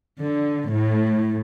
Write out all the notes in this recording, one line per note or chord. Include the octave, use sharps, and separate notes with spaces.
D3
A2